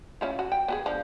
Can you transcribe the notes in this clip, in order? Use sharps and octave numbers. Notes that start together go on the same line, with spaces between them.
C#4 E4 F4
F#4
G5
B3 F#4 G#4
F3 D4